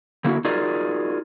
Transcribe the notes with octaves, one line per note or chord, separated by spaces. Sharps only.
D3 A#3 E4 F#4
D#4 F4 F#4 G#4 A#4 D5